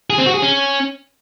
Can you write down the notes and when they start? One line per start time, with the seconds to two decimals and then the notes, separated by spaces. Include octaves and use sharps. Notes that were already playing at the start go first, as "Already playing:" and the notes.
0.10 G#4
0.18 C4
0.26 F#4
0.34 G#4
0.42 C#4